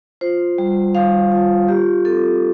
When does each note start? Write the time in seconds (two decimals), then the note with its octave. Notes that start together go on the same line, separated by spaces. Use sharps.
0.21 F4 C5
0.58 G3
0.95 G3 F5
1.32 F4
1.68 F4 G4
2.05 C4 A4